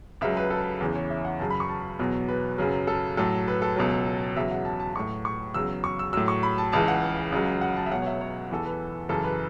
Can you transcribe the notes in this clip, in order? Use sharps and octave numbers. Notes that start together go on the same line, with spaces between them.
C#2 C#3 F#3 E5
B4
A4
E2 C#3 E3
C#5
E5
F#5
F#2 C#3 F#3 A5
B5
C#6
A5
E2 B2 F#3
B4
F#2 C#3 F#3
A4
A2 F#3 A4
B4
A4
C#2 B2 F#3
E2 C#3 F#3 E5
F#5
A5
A5
A2 F#3 C#6
C#6
E2 C#3 F#3 E6
C#6
E6
A2 F#3 E6
C#6
B5
A5
C#2 C#3 E3 A5
F#5
C#2 C#3 F#3
F#5
A5
E5
C#2 B2 F#3 F#5
C#5
E5
C#5
E2 E3 A4
B4
F#2 C#3 E3 A4
B4